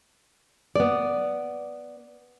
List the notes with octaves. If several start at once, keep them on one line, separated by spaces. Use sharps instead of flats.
B3 D5